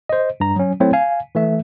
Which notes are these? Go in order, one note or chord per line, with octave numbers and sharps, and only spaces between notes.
C5 D#5
G2 A#5
F#3 C#4
F#3 A3 C4 E4 C#5
F5 G#5
E3 A3 E5